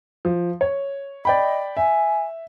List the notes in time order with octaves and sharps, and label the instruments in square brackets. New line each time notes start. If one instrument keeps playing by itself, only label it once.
[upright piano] F3
C#5
[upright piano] D5 G5 B5 [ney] D#5
[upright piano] E5 [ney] G#5